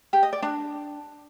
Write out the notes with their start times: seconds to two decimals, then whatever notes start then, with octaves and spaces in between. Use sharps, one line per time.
0.13 G4
0.23 D#5
0.33 D5
0.42 D4